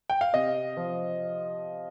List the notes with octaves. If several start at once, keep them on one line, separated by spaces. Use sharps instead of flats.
G5
F5
C3 D#5
F3